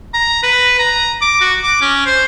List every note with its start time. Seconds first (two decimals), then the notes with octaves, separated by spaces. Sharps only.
0.14 A#5
0.43 B4
0.79 A#5
1.22 D6
1.41 F#4
1.63 D6
1.81 C#4
2.06 C5